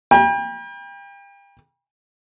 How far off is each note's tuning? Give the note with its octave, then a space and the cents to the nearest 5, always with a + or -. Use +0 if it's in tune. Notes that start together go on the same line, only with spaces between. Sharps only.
G5 +35 B5 -45